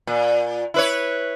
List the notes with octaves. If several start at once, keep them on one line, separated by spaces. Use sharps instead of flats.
A#2
E4 B4 C#5